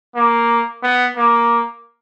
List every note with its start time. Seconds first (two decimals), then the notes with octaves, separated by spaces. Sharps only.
0.15 A#3
0.83 B3
1.17 A#3